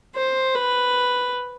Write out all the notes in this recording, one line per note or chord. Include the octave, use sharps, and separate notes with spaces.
C5
B4